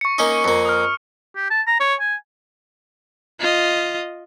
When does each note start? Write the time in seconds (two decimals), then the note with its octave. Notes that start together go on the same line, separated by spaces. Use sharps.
0.01 C#6 C#7
0.18 A#3 C#4 D#4
0.44 F2 A#3
0.65 D#6 F6
1.36 G4
1.51 A5
1.67 A#5
1.80 C#5
2.00 G#5
3.40 F4 D#5